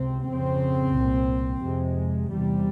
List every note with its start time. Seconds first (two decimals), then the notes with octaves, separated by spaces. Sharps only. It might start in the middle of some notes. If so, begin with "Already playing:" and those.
Already playing: C#2 C3 C4
0.30 F2 C#3 C4
0.97 C2 A#2
1.63 F2 C3 G#3
2.31 E2 C3 G3